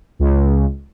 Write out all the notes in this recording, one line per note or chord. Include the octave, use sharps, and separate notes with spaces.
C#2